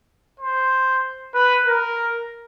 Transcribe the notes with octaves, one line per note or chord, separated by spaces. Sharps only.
C5
B4
A#4